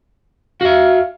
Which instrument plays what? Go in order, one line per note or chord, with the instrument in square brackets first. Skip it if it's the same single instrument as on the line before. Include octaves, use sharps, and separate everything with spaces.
[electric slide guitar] F#4 E5 [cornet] F5